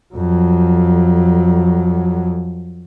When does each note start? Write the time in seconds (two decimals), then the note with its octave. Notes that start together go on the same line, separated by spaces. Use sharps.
0.14 F2 F#3